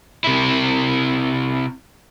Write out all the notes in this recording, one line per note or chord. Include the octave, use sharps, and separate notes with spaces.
C3 E4